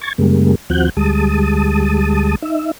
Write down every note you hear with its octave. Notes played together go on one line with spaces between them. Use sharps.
C#6 G#6 A6
F#2 C#3 G3 G#3 A#3
D#2 F3 C4 F#4 F#6 G6
D2 G3 G#3 A5 D#6
D#4 E5